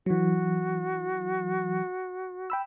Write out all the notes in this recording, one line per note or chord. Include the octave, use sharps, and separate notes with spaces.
E3 F#3 F#4
G5 B5 E6